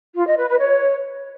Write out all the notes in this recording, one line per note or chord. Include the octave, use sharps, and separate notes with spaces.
F4
D#5
B4
B4
C#5